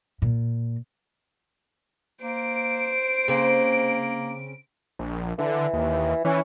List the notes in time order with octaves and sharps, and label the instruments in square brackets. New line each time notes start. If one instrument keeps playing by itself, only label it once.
[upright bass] A#2
[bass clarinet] A#3 [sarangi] C5 [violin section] D7
[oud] C#3 C4 [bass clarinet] A#3
[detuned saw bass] A#1
[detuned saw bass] D3 [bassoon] E3
[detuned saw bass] D#2
[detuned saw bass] E3 [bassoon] C#4